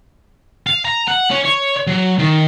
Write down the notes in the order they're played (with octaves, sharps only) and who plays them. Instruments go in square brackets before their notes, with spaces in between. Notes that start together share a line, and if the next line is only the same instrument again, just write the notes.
[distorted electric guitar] F5
A#5
F#5
C#4
C#5
F#3
D#3